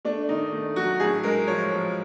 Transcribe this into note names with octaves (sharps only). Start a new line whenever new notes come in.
A3 D4
D#3 D#4
A3
F#3 F#4
A2 G#4
G#3 A#4
F3 C#5
F3